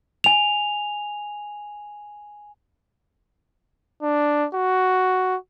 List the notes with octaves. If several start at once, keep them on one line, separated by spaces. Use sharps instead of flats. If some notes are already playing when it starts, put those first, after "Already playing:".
G#5 F7
D4
F#4